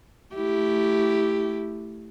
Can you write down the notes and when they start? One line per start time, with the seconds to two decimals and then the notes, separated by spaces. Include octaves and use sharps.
0.34 A3 E4 G4